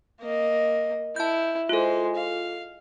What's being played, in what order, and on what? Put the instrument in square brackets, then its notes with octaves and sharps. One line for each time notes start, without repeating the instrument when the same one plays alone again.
[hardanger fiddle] A#3 D#5
[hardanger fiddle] E4 [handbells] A5 G6
[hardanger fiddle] G#3 C5 [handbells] F4 A4
[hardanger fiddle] F5